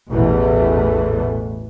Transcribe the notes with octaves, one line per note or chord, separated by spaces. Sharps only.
A1 E2 B2 E3 A3